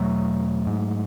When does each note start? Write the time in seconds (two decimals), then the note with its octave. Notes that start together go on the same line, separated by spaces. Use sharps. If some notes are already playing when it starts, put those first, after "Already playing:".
Already playing: E2 B2 F#3 A3
0.67 G#2